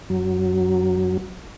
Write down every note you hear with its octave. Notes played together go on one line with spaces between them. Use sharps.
F#2 F#3